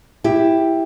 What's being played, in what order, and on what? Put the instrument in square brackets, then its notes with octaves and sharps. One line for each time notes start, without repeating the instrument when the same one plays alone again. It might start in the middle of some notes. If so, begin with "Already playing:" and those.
[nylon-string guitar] E4 G4